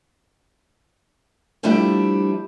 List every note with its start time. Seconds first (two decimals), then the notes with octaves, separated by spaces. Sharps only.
1.63 F3 G3 A3 D4 E4